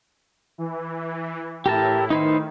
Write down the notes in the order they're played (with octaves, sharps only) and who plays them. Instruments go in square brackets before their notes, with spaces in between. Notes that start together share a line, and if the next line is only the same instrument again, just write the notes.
[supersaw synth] E3
E3
[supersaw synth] A2 E4 [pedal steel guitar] G4 A#4 A5
[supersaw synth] D#3 [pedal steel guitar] D#4 B4 C5